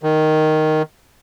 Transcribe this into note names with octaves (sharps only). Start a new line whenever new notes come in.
D#3